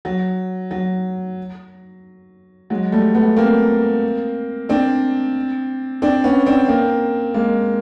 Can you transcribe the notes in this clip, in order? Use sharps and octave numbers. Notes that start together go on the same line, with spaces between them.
F#3
F#3
F#3 G#3
G3 A3
A3 B3
A#3 C4
C4 D4
C4 D4
B3 C#4
C4 D4
A#3 C4
G#3 A#3